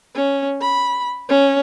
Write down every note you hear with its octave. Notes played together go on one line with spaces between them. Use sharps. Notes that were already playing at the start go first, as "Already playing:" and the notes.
C#4
B5
C#4